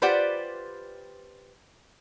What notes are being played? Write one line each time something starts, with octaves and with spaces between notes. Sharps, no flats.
F4 G4 B4 C5 D5 F#5